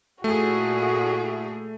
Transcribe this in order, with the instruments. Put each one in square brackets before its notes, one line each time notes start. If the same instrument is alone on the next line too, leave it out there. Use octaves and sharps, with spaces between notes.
[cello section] A#2 E4 G#4 [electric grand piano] A3 [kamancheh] F#4